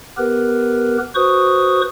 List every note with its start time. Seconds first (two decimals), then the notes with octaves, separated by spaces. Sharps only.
0.17 B3 G4 A#4 B4
1.15 F#4 B4 C5 C#6 D#6